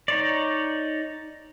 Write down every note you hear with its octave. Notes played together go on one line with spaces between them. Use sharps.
D#4 C#5 D5